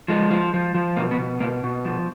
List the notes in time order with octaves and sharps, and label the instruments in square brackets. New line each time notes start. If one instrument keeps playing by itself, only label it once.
[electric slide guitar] F3 G#3
F3
F3
F3
B2 A#3
B3
B2
B2 A#3
B2
F3